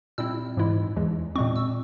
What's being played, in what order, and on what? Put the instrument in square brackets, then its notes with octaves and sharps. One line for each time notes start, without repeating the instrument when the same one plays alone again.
[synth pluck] A#2 G3 C4 E4 E6
G#2 E3 G#3 E4
E2 E3 G#3
A#2 G#3 C4 C#6
E6